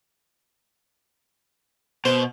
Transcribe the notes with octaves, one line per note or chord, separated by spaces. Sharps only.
B2 C5